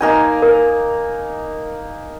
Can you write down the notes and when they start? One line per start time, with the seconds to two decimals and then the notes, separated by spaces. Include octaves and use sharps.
0.01 A#3 D#4 G#5
0.42 A#4